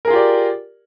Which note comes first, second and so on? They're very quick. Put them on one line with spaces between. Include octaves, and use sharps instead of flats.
A#4 G#4 F4 G4 D5